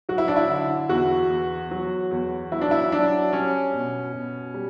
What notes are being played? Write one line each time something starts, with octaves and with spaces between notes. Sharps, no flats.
F#3 F#4
E4
D4
E4
D3
E2 F#4
E2
F#3
E2
F#3 E4
D4
E4
F#3 D4
G3 C#4
B2
B2
G3